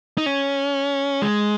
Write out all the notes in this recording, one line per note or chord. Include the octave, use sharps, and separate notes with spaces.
D#4
C#4
G#3